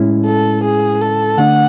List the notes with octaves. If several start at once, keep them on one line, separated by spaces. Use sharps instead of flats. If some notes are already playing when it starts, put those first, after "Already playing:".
Already playing: A2 G#3 C#4 E4
A4
G#4
A4
D3 A3 D4 F#5